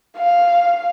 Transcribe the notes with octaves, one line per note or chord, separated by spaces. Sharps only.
F5